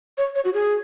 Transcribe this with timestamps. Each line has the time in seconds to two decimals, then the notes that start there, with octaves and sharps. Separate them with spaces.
0.18 C#5
0.35 C#5
0.45 F#4
0.54 G#4